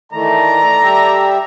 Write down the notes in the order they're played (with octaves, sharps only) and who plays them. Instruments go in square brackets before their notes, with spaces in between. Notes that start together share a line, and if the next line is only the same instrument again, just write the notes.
[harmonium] D#3 E3 A3 [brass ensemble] A4 D5 A#5
[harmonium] G3 G4 E5